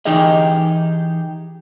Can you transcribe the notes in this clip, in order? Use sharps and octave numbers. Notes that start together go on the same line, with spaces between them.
E3 D#4 G4 G#4 D#5